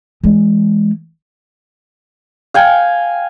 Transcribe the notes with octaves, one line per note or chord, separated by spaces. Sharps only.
E3 G#3
F5 G5 G#5